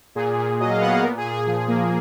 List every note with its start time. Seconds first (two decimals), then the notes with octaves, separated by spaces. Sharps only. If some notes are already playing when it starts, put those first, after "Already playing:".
0.15 A#2 G#4
0.37 A#2
0.59 F#3 D#5
0.71 F5
0.81 B3 F#5
0.92 F5
1.02 A#2 A#4
1.17 G#4
1.25 A#2
1.32 G#4
1.47 F3
1.68 A#3